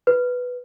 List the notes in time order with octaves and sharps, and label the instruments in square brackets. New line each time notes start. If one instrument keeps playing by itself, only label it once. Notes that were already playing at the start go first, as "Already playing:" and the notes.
[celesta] B4